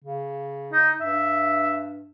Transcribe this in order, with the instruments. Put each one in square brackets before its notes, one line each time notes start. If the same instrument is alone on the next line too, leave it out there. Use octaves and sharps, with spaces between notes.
[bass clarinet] C#3
[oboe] D#4
[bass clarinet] G2 [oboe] E5